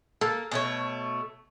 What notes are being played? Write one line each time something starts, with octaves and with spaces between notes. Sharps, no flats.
A#3 A4
B2 A3 C#5